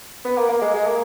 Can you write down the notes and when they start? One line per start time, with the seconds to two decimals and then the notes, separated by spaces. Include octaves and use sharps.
0.25 B3
0.37 A#3
0.49 A#3
0.62 G#3
0.74 G#3
0.86 A#3